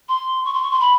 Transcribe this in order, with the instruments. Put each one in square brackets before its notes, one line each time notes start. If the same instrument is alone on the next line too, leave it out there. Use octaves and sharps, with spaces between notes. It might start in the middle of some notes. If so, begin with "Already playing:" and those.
[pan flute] C6
C#6
C6
C#6
C6
B5